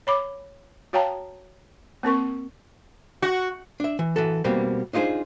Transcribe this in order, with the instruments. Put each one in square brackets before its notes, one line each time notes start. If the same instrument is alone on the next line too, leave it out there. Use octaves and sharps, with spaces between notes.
[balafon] C#5 B5 D6
F#4 C#5 F5 G5 A5 A#5
A#3 C4 A#4 C#6
[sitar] F#4
[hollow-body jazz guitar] D4 E5
E3
E3 F#4 A4
B2 G3 A#3 C4
D4 D#4 F4 G#4 C5